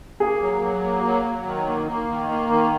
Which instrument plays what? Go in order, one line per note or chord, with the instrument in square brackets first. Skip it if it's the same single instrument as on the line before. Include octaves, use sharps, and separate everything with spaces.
[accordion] A#3 [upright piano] G#4
[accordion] F#3
F#3
A#3
F#3
F#3
D#3
A#3
A#3
D#3
A#3
D#3